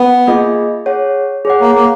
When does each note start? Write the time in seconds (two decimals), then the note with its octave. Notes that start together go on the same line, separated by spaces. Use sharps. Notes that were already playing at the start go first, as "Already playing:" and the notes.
Already playing: B3
0.27 A#3 F4 G#4 D#5
0.86 G#4 C#5 F#5
1.45 G#4 C#5 F#5
1.61 A#3
1.75 A#3